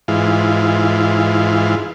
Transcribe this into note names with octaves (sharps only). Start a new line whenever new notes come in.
G#2 E3 F4